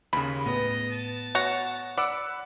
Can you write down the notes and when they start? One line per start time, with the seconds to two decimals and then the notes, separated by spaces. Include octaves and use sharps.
0.13 D#2 C#3 B5
0.46 A2 B3 B4 D#5
0.92 A5
1.35 F#4 C#5 F#5
1.97 D5 F#5 B5 D6 E6 F#6